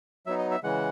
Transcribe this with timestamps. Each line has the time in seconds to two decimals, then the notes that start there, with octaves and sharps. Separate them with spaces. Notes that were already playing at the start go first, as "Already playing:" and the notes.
0.26 F#3 B3 D#4 E5
0.39 D#5
0.51 E5
0.64 C#3 E3 G#3 F#5